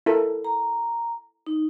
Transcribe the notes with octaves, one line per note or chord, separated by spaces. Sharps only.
E4 A4 A#4
A#5
D#4